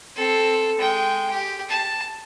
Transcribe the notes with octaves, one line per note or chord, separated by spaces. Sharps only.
C4 A4
G#3 G5
G4
A5